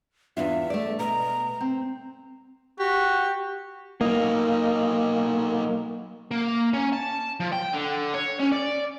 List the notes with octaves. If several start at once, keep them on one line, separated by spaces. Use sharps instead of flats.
E2 D4 F4 E5
A3 D5
B2 A#5
C4
F#4 G4
F#3 A#3 D#4
A#3
C#4
A5
F3
G5
D3
C#5
C#4
D5